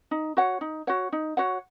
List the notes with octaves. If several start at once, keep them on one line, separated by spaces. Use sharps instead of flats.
D#4
F#4 C#5 F#5
D#4
F#4 C#5 F#5
D#4
F#4 C#5 F#5